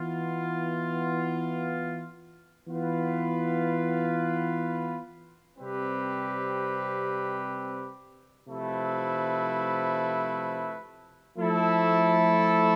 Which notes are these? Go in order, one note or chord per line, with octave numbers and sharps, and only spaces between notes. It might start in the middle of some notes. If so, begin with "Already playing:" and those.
Already playing: E3 B3 F4
E3 B3 F4 B4
C3 G3 C4 G4 B4
C3 F3 A3 E4 B4
F3 A3 E4 A4